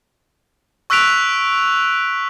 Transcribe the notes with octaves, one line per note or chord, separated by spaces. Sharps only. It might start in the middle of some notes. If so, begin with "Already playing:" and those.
C#6 E6 F#6 B6 D7 F7